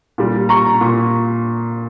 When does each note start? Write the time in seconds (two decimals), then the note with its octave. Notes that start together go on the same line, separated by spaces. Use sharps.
0.18 A#2 G3
0.49 A#5 C#6
0.81 A#2